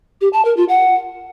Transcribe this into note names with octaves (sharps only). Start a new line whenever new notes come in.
G4
A5
A#4
F4
F#5